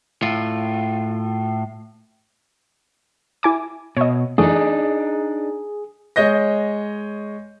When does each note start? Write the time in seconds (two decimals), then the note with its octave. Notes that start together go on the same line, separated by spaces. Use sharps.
0.23 A2 F4
3.43 E4 G#5 D6
3.97 B2 C#5 D#5
4.38 F#2 E3 A3 D4 D#4 G#4
6.16 G#3 C#5 D#5 G6 A#6